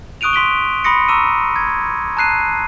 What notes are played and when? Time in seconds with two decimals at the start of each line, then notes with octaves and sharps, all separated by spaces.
0.21 C#6 D#6 F#6 D7 D#7 F7
0.33 C6 B6 D7 G7
0.84 B5 C6 D#6 A#6 C#7
1.08 A#5 C#6 E6 D#7
1.56 G#6
2.17 A5 A#5 F#6 C7 D#7